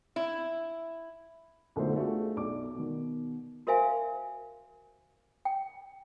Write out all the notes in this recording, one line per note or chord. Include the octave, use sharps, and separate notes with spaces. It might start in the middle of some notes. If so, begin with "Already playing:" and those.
E4
B1 D3 F#3 A3 F4 C5
A3 D4 F4 F#4 G#4
B1 D5 D6
B2 D#3
F#4 A#4 C5 E5 F5 G#5
G5